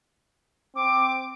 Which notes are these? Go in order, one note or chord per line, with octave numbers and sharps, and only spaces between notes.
C4 D6